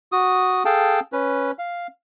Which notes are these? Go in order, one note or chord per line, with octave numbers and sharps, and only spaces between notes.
F#4 D#6
G#4 A4 F5 G5 A5
C#4 B4
F5